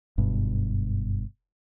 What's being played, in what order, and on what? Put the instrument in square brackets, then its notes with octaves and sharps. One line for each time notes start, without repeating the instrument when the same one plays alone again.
[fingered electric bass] F#1 G2 B2